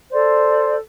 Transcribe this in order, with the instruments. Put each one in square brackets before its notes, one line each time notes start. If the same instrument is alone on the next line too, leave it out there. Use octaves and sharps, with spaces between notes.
[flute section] A4 C5 D5